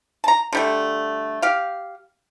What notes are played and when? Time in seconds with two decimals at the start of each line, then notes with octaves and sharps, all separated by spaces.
0.24 A5 A#5
0.53 D3 G3 A3
1.42 G4 F5